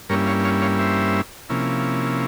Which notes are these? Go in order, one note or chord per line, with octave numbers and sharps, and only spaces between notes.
G2 G3 A#3 C#4 E4 A#4 C#5
C#5 F5
C#5 F5
C#5 F5
C5 E5
C3 F3 A#3 C#4 E4